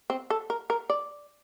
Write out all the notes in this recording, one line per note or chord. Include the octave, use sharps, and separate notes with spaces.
C4
A4
A#4
A#4
D5